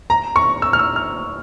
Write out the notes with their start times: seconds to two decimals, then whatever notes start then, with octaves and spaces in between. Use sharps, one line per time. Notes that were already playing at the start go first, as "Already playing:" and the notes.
0.10 A#5
0.36 C#6
0.62 E6
0.73 F6
0.79 E6
0.96 F6